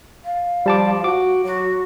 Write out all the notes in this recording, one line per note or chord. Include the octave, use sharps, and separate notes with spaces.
F5
F3 G3 A5 D6
F#4 D6
F#3 F#4